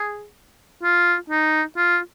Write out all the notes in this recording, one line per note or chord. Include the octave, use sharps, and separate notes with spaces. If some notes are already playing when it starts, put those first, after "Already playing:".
Already playing: G#4
F4
D#4
F4